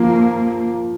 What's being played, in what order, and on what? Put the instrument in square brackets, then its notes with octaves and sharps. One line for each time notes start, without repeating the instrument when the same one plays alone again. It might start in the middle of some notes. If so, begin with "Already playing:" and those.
Already playing: [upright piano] F3 [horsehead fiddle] A#3